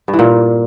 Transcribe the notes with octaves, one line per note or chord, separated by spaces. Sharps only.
G2
E3
A#2